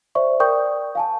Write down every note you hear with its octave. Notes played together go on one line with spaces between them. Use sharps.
C5 D5 E5 C#6
A#4 D5 G5 C#6 D#6 G6
F5 G#5 A5